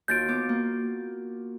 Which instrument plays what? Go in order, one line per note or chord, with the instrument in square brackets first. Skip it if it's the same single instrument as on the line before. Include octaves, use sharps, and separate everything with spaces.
[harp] D#2 F4 F#4 [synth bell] G6 A6 D7
[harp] B3 D6
A#3